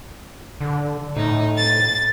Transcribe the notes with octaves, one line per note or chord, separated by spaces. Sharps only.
D3
A2 D#4
A6